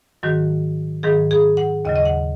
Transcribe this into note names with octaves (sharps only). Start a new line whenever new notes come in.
G#2 D#3 F#3 F#4
G#2 D#3 F#3 G#4
G#4
F#5
D#2 C#3 F#3 D#5
D#5
F#5